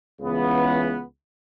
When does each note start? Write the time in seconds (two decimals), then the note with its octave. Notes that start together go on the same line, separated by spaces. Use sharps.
0.20 C#2 C#3 E3 B3